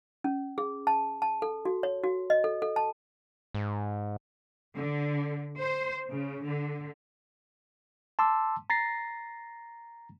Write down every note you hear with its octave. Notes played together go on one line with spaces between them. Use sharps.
C#4
G#4
A5
A5
A4
F#4
C#5
F#4
D#5
A4
A4
A5
G#2
D3
C5
C#3
D3
A5 C6 D6 E6
A#5 A6 A#6 C7